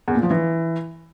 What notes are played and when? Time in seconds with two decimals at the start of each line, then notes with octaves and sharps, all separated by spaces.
0.08 E2
0.15 A#2
0.23 F3
0.31 E3